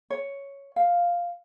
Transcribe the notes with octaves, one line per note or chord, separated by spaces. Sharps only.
C#5
F5